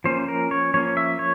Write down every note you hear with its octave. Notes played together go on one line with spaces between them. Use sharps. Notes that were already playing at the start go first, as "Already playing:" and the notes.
F3 A#3 C#4 C5
A#4
C#5
F3 A#3 C#4 C#5
E5
C#5